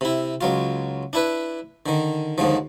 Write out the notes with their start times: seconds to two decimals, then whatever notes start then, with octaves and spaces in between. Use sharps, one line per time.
0.01 C3 E4
0.41 C#2 F#3 F4
1.13 D4 E4 B4
1.86 D3 D#3
2.38 D#2 G#2 D3 F3